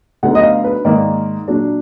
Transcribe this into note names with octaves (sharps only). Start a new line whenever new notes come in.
D2 D3 F#3 B3 D#4 F#5
D#5
F5
B4
G#2 D#3 A#3 D#4 D5
A#2 F#3 D4